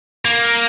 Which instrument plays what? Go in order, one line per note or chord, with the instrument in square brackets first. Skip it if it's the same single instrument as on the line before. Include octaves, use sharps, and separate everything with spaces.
[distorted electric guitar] A#3